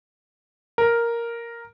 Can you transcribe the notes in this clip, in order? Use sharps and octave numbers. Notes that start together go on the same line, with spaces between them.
A#4